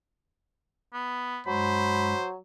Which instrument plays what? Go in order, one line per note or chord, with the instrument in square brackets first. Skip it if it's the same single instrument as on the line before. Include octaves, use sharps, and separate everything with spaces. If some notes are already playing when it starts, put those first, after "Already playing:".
[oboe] B3
[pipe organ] G2 G#3 [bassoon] F#3 [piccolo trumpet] C5 [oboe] B5